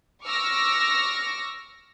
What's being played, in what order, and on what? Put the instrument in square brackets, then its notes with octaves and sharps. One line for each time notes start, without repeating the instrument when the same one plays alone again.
[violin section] C#6 D6 E6 F6 A#6